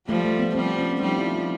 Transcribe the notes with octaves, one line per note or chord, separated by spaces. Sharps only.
F3 G3 A3
A3
B3
F3 G3 C4
C#4
F3 G3 D#4
E4
F4